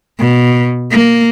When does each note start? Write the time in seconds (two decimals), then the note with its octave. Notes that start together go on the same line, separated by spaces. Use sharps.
0.19 B2
0.91 A#3